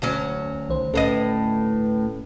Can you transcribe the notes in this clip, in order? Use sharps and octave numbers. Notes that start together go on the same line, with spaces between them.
D2 F#3 C#4
C2 D#3 C5
D2 A2 C#4 A4 B4 D#5